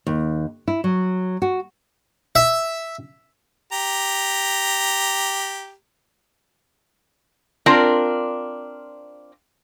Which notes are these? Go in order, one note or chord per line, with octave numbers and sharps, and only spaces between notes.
D#2
E4
F#3
F#4
E5
G4 A#5
C4 D4 F4 A#4 D5